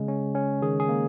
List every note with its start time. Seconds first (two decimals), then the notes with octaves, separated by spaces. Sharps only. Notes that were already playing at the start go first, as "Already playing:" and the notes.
Already playing: C#3 G#3
0.08 C#4
0.35 C#4
0.62 D#3 G#4
0.80 G#4
0.89 A#3